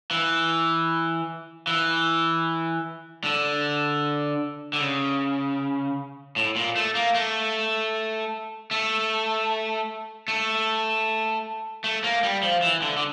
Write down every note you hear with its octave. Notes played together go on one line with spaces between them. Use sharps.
E3
E3
D3
D3
C#3
A2
A#2
A3
A#3
A3
A3
A3
A3
A#3
G3
F3
E3
D3
D3